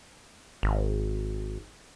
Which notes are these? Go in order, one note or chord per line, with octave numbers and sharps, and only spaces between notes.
G#1